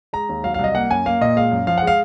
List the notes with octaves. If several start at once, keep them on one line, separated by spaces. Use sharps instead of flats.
G#3 A#5
D#2
F#3 F5
C2 F5
D#5
A#3 F#5
F#2 G#5
A#3 F5
A#2 D#5
G#3 F5
F#2
F3 F5
G#3 F#5
F5